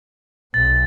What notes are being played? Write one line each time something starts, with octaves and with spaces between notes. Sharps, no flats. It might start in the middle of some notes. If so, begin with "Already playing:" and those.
B1 A6